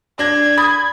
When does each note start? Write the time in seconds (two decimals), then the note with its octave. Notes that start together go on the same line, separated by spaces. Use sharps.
0.19 D4 G#6 A#6
0.57 B5 D#6 A6